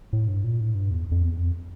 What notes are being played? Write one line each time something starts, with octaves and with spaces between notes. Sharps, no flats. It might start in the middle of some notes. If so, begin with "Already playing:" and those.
A2
G2
A#2
A2
G2
E2
F2
E2
F2